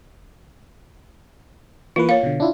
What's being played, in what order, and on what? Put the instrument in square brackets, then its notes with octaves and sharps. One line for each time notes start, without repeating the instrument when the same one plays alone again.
[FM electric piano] E3 A#3 B4 [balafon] F4
[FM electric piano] A#3 [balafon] C#5 F5
[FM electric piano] B2 D3
D4 E4 F4